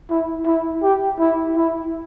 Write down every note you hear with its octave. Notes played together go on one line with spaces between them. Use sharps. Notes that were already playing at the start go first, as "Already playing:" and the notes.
E4
E4
G4
E4
E4